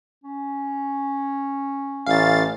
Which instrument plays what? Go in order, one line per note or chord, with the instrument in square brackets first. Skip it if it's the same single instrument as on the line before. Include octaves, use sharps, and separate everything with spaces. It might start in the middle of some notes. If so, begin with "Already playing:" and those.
[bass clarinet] C#4
[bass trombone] A1 [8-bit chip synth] F5 A6